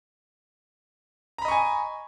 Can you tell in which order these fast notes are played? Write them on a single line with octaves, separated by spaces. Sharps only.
A#5 B5 D#5 C#6 G#5